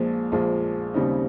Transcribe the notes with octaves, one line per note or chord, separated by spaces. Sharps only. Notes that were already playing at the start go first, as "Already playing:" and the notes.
Already playing: A#1 A#2 F3 G#3
A#1 A#2 F3 G#3
D#2 C#3 G3 C4 D#4